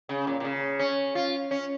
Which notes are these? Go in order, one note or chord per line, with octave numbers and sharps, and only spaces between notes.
C#3
A#2
A#2
C#3
C#4
F4
C#4